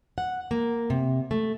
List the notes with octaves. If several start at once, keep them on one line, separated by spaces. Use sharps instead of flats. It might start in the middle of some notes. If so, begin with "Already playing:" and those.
F#5
A#3
C3
A3